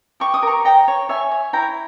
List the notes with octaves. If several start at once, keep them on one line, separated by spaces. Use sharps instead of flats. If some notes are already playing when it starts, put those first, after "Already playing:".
G4 C#6
D#6
A#4 A#5 C#6
C#5 G5 A#5
C#5
C#5 E5 G#5
C#5
E4 G5 A#5